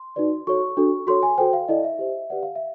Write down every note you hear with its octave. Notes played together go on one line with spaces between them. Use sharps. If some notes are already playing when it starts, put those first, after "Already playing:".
Already playing: C6
D#4 F#4 B4 D5
F#4 A4 C#5 C#6
D4 F#4 A4
F#4 A4 C#5 C6
G#5
F#4 A4 C5 G5
F5
E4 A4 D5 D#5
E5
G4 C5
G4 B4 D5 F#5
F5
E5